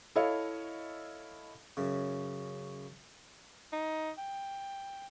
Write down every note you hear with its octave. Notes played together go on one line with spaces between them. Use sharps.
E4 A4 C#5 D#5 F5
F#2 C#3
D#4
G5